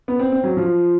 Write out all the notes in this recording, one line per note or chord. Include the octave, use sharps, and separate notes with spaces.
B3
C4
C4
F#3
F3